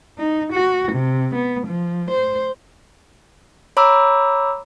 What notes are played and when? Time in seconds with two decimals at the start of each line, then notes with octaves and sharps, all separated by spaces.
0.18 D#4
0.52 F#4
0.92 C3
1.34 B3
1.67 F3
2.10 C5
3.77 C#5 A#5 B5 D6 E6